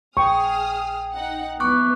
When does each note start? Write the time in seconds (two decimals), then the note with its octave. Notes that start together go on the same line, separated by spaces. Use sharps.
0.17 A#1 G#4 G5 C#6 D#6 F6
1.12 D#4 F#5
1.60 E3 B3 C#6 D6 F#6